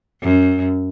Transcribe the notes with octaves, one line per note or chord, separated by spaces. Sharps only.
F#2